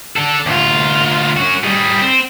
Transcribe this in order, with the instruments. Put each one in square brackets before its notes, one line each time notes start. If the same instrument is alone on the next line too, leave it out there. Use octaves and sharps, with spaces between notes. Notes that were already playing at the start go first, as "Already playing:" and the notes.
[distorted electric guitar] D4 A4
D2 F4
C#4 F#4
G3 G#4
C4